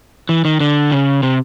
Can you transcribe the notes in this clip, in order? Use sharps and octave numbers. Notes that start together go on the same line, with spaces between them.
E3
D#3
D3
C#3
C3